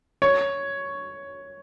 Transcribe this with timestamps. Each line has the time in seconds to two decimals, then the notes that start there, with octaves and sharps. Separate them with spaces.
0.22 C#5